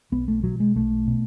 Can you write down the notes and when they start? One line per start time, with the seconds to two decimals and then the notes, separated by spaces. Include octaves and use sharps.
0.12 B1 B3
0.28 A3
0.43 B2 F#3
0.60 G#3
0.76 B1 A3
1.07 B2